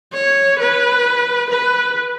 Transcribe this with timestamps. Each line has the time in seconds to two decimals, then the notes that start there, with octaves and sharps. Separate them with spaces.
0.13 C#5
0.59 B4
1.51 B4